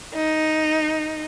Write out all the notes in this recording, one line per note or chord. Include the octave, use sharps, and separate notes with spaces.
D#4